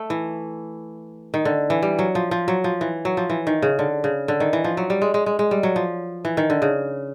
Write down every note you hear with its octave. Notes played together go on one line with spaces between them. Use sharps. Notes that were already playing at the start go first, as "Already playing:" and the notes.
Already playing: A3
E3
D#3
D3
E3
G3
F#3
F3
F3
F#3
F3
E3
F#3
F3
E3
D#3
C#3
D3
C#3
D3
D#3
E3
F3
F#3
G3
G#3
G#3
G#3
G#3
G3
F#3
F3
E3
D#3
D3
C#3